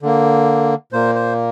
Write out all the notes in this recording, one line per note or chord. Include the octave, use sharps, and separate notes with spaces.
D3 A#3
A#2 A#3 C5
C5